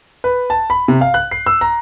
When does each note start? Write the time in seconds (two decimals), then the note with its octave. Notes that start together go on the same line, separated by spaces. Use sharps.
0.24 B4
0.50 A5
0.70 B5
0.88 C3
1.01 F5
1.14 F#6
1.31 C7
1.46 E6
1.61 A#5